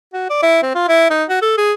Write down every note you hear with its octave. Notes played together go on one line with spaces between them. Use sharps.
F#4
D5
E4
C4
F4
E4
D#4
F#4
A4
G#4